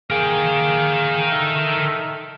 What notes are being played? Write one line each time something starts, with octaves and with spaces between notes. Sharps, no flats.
A#3 G#4 A#4 G5
D#4 A4 E5